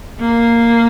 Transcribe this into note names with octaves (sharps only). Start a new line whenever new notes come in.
A#3